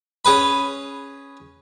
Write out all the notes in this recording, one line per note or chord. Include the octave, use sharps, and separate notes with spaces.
C#4 G#4 B4 B5